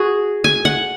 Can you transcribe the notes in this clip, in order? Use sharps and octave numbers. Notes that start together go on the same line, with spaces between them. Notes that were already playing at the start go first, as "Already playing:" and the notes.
Already playing: F#4 G#4
G#5
F#5